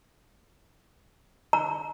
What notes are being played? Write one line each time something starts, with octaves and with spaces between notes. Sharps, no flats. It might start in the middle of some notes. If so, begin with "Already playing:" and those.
A#5